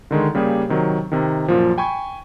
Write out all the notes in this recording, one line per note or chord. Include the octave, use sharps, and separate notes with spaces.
D3 D#3 G#3
C#3 G3 A#3 G4 G#4
C3 D#3 F#3
C3 D#3
F#2 A#2 F3
G5 G#5 B5 C#6 G#6